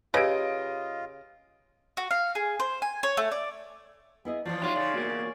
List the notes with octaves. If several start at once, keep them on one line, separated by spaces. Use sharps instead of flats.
C#3 F4 G4 B4 D#5 D7
F#4
F5
G#4
C5
G#5
C#5
A3
D5
B3 E4 G#4 D#5
E3 F3 F4 C5 D5
F#3 D#4 F4 G4 C#5 F5 C6
C#3 D5
E2 B2 A#3 F#4